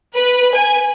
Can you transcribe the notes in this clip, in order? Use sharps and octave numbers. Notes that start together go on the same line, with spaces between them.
B4
G#5